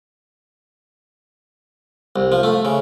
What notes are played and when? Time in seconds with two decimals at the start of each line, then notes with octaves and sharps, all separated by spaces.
2.16 C2
2.32 F3
2.43 A3
2.65 C#3